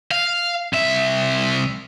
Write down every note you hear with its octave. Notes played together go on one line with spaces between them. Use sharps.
F5
C2 E5